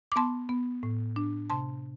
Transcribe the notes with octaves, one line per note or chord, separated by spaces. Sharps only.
D6
B3 A5 C6
B3
A2
D4
C3 A5 C6